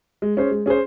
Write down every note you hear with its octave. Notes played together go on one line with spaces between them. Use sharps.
G#3
C#4 G#4 C5
G#3
C#4 G#4 C5